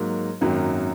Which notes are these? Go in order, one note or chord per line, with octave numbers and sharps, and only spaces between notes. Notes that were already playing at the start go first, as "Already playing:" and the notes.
Already playing: G#2 F#3 A#3
G#1 F#2 D#3 F#3 A#3